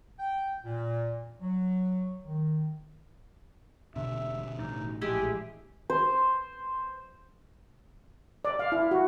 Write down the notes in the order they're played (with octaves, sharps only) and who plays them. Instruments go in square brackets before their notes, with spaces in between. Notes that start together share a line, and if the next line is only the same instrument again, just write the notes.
[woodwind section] G5
A#2
F#3
D#3
[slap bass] E1 [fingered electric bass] B2 D3 [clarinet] E5
[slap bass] A1 [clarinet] D#4
[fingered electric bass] A#1 [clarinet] G#3 [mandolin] E4 G4 G#4
[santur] C5
[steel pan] D5
F5
E4
F#4